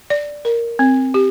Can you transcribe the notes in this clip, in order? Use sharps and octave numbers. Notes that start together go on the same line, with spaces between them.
D5
A#4
C4
G4